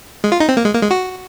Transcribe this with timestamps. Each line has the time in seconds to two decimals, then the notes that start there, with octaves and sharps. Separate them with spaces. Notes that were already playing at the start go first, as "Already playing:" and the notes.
0.24 G#3
0.32 F4
0.40 D#4
0.49 C4
0.57 A#3
0.65 G#3
0.74 A#3
0.82 G#3
0.91 F#4